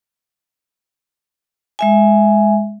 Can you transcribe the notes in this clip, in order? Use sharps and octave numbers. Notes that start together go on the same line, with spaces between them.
G#3 E5 G#5